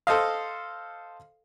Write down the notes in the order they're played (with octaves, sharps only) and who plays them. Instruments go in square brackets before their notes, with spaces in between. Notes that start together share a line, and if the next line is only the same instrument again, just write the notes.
[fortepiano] A4 C5 D#5 F5